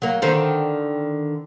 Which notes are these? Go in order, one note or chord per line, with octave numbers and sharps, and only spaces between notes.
F#3 A#3
D3 D#3 C4